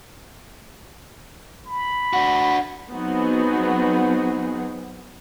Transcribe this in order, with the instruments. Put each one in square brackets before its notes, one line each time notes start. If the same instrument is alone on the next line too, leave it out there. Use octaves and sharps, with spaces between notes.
[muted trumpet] B5
[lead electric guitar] D4 F#4
[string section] F#3 B3 C4 D#4 F#4 G#4